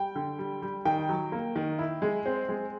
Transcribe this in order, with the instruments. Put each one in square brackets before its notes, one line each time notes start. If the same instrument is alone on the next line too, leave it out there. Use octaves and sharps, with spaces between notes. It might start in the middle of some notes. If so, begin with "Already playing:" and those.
Already playing: [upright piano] G3 G5
D3
G3
G3
D#3 G5
F#3
A#3
D#3
E4
G#3
C4
G#3